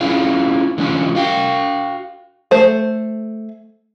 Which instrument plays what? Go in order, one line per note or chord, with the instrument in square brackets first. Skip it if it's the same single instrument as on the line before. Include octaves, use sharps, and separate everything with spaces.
[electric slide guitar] C#4 E4 F4 G#4 F5
D3 E3 G#3 C#4 D#4 F4
F#4 F5 G5
[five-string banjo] A3 C5